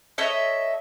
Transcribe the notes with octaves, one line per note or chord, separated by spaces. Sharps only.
A4 C#5 D#5 E5